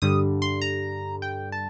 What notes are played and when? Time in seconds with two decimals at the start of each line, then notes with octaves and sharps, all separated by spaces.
0.02 G2 D3 G3 D#6
0.42 C6
0.62 A#5
1.22 G5
1.52 A5